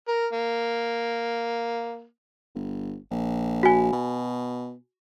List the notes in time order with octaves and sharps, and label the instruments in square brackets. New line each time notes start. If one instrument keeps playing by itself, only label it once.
[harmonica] A#4
A#3
[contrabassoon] G1
A#1
[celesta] F#4 G#5
[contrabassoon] B2